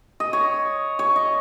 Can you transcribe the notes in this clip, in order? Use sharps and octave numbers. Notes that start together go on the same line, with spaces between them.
D#5
C#5
C#5
D#5